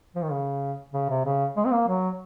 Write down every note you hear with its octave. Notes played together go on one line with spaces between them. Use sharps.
F3
D#3
C#3
C#3
C3
C#3
G#3
C4
A#3
F#3